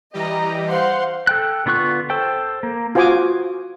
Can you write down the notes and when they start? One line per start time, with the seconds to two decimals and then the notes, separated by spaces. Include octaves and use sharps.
0.14 E3 G3 G4 D#5 A#5
0.69 C5 F5 F#5 C6
1.27 A4 G5 F#6
1.66 D3 B3 F4 C#6 F#6
2.10 A4 C5 G5
2.63 A#3
2.95 F4 F#4 C5 G#5 D6 D#6